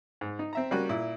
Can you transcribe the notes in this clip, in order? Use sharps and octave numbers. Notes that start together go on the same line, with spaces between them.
G#2
D#4
C4 E5 A#5
C#3 G3 A#3 C#4 F#4
A#2 E4